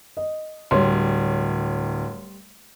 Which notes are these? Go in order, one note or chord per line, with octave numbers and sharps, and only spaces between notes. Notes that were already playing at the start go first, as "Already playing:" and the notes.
D#5
D1 G3 C#5 C6